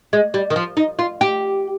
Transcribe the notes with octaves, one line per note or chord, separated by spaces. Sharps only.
G#3
G3
D#3
F3
D#4
F4
G4